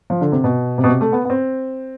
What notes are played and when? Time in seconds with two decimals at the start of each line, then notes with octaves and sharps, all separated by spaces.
0.10 F3
0.21 D3
0.32 C3
0.44 B2
0.78 C3
0.84 B2
0.89 C3
1.01 A3
1.12 B3
1.25 B3
1.30 C4